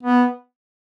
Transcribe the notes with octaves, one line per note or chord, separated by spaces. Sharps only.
B3